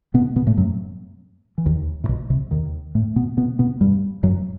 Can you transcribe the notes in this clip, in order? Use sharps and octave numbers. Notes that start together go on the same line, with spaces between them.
B2 B3
B2 B3
A2 A3
F#2 F#3
E3
D#2 D#3
A2
B1 B2
C2 C3
D#2 D#3
A2 A3
B2 B3
B2 B3
B2 B3
G2 G3
F#2 F#3